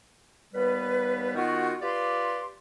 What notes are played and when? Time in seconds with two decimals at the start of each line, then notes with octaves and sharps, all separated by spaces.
0.54 D#2 G3 B3 B4
1.35 D#3 B3 F4 F#4
1.82 F4 G4 B4 D5 C6